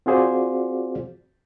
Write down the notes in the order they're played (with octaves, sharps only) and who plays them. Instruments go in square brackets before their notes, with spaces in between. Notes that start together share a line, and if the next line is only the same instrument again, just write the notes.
[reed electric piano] C4 F4 F#4 G#4 C5 D5